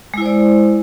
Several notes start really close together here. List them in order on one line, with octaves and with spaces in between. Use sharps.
G#3 E4 C5 D5